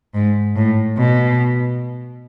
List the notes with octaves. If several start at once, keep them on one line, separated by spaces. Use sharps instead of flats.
G#2
A2
B2